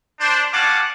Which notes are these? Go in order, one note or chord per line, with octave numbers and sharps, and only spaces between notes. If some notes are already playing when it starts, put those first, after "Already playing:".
D4 C5
G3 C#4 F5 F#5 A5 D6